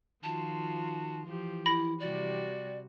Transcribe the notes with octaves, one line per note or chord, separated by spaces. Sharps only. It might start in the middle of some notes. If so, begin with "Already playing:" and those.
D#3 F3 F4 F#4 A5
E3 F3 G4
E4 B5 A#6
C3 G3 F#4 D5